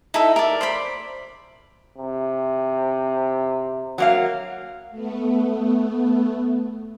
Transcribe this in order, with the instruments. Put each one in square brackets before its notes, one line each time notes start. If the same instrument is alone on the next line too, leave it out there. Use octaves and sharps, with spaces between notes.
[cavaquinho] D#4 E4 A4 E5
A#4 D5
C5 D5 B5
[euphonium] C3
[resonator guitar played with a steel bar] F#3 A#3 F5
[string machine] A3 B3